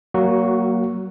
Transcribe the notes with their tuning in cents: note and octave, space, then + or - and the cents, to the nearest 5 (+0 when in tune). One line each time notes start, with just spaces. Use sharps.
F#3 +30 A#3 +0 F#4 +0